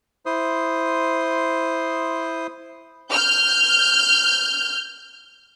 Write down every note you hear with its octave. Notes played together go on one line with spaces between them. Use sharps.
E4 C5 C6 D#6
F6 G6